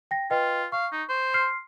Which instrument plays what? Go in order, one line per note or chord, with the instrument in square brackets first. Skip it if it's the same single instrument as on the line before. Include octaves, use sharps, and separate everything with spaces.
[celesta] G5 A#6
[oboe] F4 [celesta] B4 D#5 G5
[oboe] F5 [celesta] C#6
[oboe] D#4
C5
[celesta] C6 F6 C7